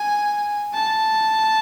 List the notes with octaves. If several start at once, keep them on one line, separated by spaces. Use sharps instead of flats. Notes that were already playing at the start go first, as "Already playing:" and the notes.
Already playing: G#5
A5